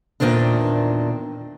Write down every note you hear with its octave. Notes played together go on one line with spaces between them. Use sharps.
E2 G2 A#2 D#3 C4 D4